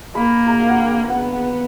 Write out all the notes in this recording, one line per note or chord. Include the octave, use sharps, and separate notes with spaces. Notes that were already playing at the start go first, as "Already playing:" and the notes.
A#3 B5
A#5
F5
F#5
G5
B3 F#5
F#5